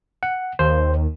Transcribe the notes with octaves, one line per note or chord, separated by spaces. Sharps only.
F#5
D#2 C5